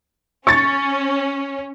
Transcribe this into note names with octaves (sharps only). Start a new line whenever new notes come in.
C#4 C#6 A6